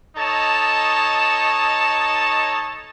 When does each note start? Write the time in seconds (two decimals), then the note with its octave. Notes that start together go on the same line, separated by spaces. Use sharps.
0.17 D#4 A4 C#5 D#5 A5